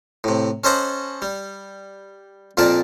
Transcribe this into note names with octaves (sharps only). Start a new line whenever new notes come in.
A2 C3
C#4 A4 C5 D#5 F#5 B5
G3
F2 A#2 A#3 A#4 D5 A5